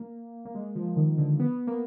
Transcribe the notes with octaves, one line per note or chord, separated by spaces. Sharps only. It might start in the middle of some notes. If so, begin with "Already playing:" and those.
Already playing: A#3
A#3
G#3
F3
D#3
D3
B3
A#3